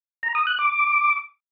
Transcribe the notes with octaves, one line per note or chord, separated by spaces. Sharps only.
A#5
D#6
F#6
D6